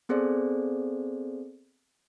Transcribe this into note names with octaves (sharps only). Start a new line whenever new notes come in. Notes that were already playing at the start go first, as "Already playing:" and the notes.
B3 C4 G#4 A4 C5 D5